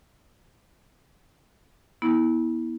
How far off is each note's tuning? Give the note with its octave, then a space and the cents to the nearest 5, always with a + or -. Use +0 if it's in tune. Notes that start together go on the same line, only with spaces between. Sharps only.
B3 -30 E4 -30